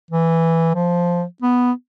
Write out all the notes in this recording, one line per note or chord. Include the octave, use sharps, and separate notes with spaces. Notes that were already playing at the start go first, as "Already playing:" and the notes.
E3
F3
B3